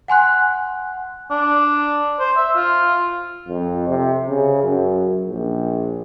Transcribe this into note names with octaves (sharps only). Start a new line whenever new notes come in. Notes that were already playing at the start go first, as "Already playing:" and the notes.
F#5 G#5 C6 F#6
D4
C5
E5
F4
F2
C3
C#3
F#2
A#1